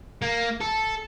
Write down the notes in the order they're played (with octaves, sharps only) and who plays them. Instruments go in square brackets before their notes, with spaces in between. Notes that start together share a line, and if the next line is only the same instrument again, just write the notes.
[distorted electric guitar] A#3
A4